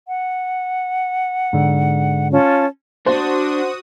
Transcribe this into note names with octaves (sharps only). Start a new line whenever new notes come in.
F#5
G#2 D3
C#4 F4 A5
D4 F#4 C5 D#6